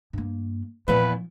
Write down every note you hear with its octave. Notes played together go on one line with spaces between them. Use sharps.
G2 A#3
E2 A#2 F3 B3 B4